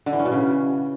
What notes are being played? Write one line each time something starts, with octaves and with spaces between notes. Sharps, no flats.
D3
E3
C#4
B2
C#3